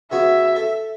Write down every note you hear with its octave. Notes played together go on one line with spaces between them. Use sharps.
C#3 B3 F#4 E5
A4